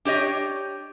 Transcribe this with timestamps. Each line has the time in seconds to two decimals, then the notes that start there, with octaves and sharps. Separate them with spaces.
0.05 D4 G4 C#5 D#5